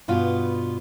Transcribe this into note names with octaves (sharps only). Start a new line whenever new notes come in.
G2 B2 B3 F4